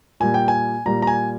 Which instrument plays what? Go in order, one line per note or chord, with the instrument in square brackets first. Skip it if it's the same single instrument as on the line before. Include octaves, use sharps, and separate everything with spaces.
[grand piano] A#2 G3 G#5
G5
G#5
A#2 G3 A#5
A#5
G#5